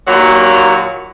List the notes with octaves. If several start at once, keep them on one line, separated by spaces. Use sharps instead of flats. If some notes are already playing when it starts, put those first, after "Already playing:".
D#2 A#2 F#3